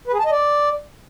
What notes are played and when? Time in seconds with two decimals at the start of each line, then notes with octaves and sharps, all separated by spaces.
0.08 B4
0.14 G#4
0.20 A5
0.26 D#5
0.32 D5